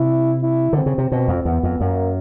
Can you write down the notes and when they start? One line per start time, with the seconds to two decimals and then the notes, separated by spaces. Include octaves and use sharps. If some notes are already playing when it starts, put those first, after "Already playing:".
Already playing: C3 E4
0.43 E4
0.73 D3 C4
0.86 C#3
0.98 C3
1.12 B2 C4
1.28 F2
1.45 E2 B3
1.63 F2
1.80 F#2 A#3